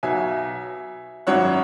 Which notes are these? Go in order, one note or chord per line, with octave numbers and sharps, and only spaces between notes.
B1 B2 F#3 E5 G#5
G#1 F#2 F#3 C#5 F#5